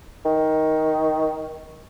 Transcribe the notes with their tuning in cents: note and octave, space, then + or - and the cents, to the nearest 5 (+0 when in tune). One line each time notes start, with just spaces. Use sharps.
D#3 +10